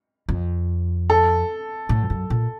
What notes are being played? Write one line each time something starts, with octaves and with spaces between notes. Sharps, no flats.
F2
A4
A2
F2
F#2
A#2